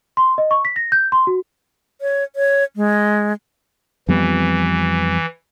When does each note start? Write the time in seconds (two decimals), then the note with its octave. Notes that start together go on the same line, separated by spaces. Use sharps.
0.17 C6
0.38 D#5
0.51 C#6
0.65 B6
0.76 A#6
0.92 G6
1.12 C6
1.27 F#4
2.01 C#5
2.36 C#5
2.76 G#3
4.09 F2 E3 G3 B3